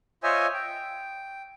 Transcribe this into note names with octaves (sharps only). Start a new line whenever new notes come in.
F4 C5 C#5 D#5 E5 G#5
G5